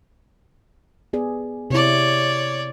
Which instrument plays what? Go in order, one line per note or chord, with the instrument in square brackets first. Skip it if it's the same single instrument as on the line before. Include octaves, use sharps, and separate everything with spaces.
[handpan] B3 G#4 D5
[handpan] C3 E4 [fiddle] C#5 D5